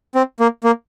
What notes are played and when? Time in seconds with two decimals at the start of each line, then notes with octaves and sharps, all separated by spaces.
0.15 C4
0.40 A#3
0.64 A#3